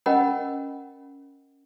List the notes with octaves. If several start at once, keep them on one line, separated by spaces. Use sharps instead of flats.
C#4 A#4 D#5 F#5 G5 B5